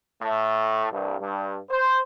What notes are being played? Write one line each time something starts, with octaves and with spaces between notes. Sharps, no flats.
A2 A3
C2 G2
G2
C5